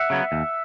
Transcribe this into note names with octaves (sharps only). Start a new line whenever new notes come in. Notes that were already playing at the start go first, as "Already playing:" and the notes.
Already playing: E5 F#5
C#3 F#3 B3
D#2